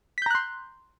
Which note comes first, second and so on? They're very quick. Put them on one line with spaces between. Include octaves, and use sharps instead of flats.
B6 G6 A#5 F#6 C6